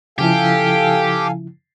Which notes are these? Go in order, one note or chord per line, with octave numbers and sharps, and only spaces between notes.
C#3 F3 E4 G4 A4 F5 G#5